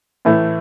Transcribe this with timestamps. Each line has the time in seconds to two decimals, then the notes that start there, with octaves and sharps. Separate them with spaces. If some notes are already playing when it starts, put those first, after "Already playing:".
0.25 A2 E3 A3